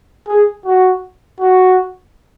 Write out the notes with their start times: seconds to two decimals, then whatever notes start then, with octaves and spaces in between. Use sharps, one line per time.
0.28 G#4
0.65 F#4
1.40 F#4